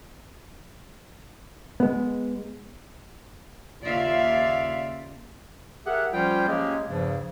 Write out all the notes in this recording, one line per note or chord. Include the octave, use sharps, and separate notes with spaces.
G#3 B3
D#2 C#3 F4 D5 E5 F5
G4 G#4 A#4 E5 F#5
F3 G3 C#4 F4 C5 G5
F#3 G#3 A#3 C#4 G4 G#4
E2 G2 C#3 F3